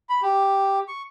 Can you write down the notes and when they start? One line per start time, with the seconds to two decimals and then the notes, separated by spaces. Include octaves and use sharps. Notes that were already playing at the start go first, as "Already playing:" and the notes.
0.09 B5
0.22 G4
0.88 C#6